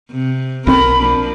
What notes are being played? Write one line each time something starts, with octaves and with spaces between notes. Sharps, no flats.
C3
B1 C4 A#4 B5
F3 A#3 D4